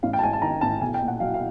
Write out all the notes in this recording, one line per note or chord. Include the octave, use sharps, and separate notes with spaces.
A1 F5
G5
A5
G#2 G#5
A5
D#3 A#5
A1 A5
B1 G#5
G5
A#2
F#5
F#3 F5
F5